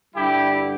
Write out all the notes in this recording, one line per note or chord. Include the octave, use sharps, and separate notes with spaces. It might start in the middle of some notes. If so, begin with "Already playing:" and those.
G2 D3 G3 E4 G4